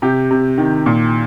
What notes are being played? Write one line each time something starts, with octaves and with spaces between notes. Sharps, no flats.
C3 G4
C3
D#3
A#2